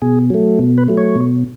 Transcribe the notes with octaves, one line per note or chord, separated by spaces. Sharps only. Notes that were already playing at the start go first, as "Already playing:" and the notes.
B2 G#4
F#3 A3
B2
B4
F#3 A3
C#5
B2